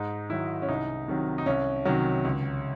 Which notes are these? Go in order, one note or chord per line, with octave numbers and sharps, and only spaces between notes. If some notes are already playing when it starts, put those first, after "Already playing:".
Already playing: G#2 D#4
D#3 F#3 E4
C#4
C2 D#4
C3 D#3 F#3
D#4
C2 C#4
C3 D#3 F#3
C#2